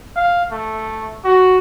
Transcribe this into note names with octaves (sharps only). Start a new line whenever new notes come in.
F5
A3
F#4